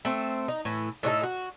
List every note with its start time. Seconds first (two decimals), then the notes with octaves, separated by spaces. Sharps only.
0.05 A3 C4
0.48 D#4
0.65 A2 E3
1.03 A2 D4 D#4 A4
1.23 F#4